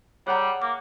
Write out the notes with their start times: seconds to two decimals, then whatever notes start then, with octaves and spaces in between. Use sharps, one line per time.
0.27 G3 G#4 C#5 F#5 A#5
0.62 A#3 D6